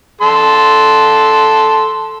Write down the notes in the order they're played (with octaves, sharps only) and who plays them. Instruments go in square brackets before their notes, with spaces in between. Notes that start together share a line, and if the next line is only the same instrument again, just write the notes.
[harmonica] A4 C6